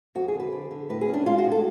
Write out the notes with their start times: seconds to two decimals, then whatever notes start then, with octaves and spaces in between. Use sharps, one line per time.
0.15 F2 F#4
0.28 G#4
0.34 D3
0.40 B4
0.52 D3
0.71 D3
0.89 A2 B4
1.01 G#4
1.08 C#4
1.14 D4
1.26 G#3 F4
1.38 F#4
1.44 A2
1.52 A4